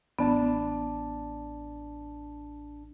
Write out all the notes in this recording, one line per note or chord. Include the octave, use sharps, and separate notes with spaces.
A1 B3 D4 A5